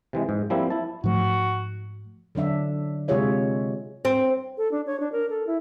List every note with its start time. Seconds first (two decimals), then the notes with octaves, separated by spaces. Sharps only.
0.13 C3 E3 G#3
0.29 G#2
0.50 F3 G3 A#3 C4 E4
0.70 E4 A5
1.04 G#2 F3 A3 F#4
2.35 D3 F#3 D4 E5
3.08 C3 G#3 F4 G#4 C#5 E5
4.05 C4
4.57 A4
4.71 D4
4.86 C#5
5.00 D4
5.12 A#4
5.30 A4
5.47 E4